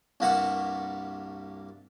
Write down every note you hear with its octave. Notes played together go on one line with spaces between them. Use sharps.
C2 G2 A#3 F#4 A5 C#6